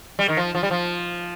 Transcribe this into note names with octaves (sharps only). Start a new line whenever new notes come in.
G3
D#3
F3
F3
G3
F3